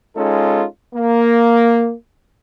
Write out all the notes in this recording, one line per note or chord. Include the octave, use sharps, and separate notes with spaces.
G#3 C#4 D#4 F4 A4
A#3